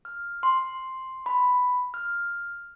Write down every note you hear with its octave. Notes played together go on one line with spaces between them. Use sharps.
F6
C6
B5
F6